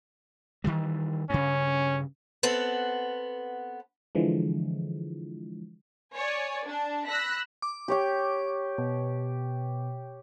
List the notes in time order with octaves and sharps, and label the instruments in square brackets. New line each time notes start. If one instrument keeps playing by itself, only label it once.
[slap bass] D#3 E3 G3
[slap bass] G2 C#3 [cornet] C#4
[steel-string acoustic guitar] B3 C4 A4 F#5
[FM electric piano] D3 E3 F3 G#3
[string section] C#5 D5 G#5
D4
B5 E6 F#6 A#6 B6
[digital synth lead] D6
[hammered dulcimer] G4 C#5 G5
[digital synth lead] B2